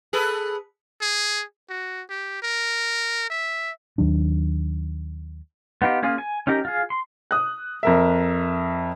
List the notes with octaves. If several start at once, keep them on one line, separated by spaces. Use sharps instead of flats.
G#4 A4 B4
G#4
F#4
G4
A#4
E5
D#2 D#3 F#3 D4
B3 D#4 F4 G4
A#3 C#4 F4 G#4
G#5
C#4 D#4 G4 A#4
F4 G#4
C6
D#6 F#6
F2 A#4 E5